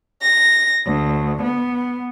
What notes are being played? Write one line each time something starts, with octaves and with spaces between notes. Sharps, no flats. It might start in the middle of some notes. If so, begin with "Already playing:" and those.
A#6
D2
B3